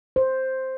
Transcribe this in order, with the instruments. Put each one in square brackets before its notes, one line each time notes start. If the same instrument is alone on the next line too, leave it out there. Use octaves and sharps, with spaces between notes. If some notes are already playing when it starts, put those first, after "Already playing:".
[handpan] C5